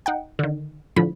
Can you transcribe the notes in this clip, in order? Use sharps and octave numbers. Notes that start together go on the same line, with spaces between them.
D#4 F#5 G5
D3 D#3
A2 D3 F3 B5